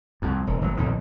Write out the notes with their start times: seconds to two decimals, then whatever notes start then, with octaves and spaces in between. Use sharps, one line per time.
0.22 C2 F2
0.47 E1
0.61 G#1 F#3
0.77 B1 F2 A#2 D#3